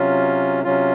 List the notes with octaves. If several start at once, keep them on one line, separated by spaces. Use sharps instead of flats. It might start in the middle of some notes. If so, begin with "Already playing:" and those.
Already playing: C3 F#3 C#4 F4
C3 F#3 C#4 F4